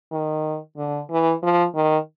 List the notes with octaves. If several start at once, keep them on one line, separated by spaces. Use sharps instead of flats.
D#3
D3
E3
F3
D#3